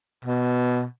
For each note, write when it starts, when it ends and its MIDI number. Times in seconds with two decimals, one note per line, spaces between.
0.25 0.84 47